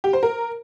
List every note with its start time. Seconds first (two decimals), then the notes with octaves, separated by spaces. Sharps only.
0.04 G4
0.13 C5
0.23 A#4